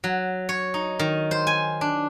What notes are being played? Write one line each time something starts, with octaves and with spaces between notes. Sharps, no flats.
F#3
C#5
D#4
D#3
C5
G#5
D4